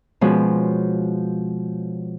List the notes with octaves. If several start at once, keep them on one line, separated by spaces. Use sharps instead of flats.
B2 F3 G#3 C#4